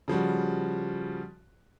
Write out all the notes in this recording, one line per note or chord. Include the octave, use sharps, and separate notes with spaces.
C#3 F3 G3 F#4